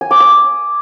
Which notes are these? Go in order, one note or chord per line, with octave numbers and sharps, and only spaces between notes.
G#5
D6
D#6